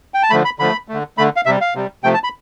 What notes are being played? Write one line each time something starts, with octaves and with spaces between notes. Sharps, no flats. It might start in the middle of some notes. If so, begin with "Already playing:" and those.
G5
A5
D3 F3 A3 B5
B5
D3 F3 A3 B5
A3
D3
D3 A3 B5
F5
C3 G3 E5
F5
C3 G3
C3 F3 A3 G5
A5
B5